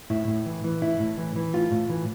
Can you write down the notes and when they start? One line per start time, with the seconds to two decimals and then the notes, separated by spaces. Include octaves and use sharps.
0.10 A2 E4
0.28 A2
0.46 E3
0.64 E3
0.82 A2 E4
1.00 A2
1.18 E3
1.36 E3
1.53 A2 F4
1.71 A2
1.90 E3